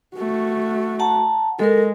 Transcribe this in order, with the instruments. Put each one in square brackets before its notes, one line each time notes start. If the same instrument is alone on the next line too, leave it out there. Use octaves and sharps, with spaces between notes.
[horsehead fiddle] A3 F#4
[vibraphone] F#5 A5 A#5
[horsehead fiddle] G#3 [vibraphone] A4 A#4